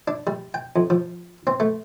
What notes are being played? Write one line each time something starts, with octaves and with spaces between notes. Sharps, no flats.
D4
G3
G5
F2
F3
C4
A3